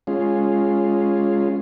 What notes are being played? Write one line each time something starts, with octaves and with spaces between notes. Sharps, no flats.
G#3 C#4 F4